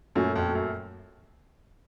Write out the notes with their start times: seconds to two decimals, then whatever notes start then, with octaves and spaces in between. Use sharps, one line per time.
0.15 F#2 A#2 F#3 A3 C#4
0.36 F2
0.55 F#2